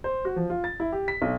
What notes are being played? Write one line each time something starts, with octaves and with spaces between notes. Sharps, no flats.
C5
F#4
F3
F4
A6
E4
G4
B6
B1